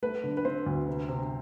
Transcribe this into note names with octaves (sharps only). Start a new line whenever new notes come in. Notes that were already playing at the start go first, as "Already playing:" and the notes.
A3 B4
D3
B4
C4 C5
D2
C3
C3